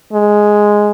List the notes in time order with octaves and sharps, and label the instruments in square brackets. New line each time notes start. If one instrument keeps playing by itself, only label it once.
[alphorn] G#3